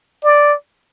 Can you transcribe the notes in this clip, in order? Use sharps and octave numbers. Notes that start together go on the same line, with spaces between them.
D5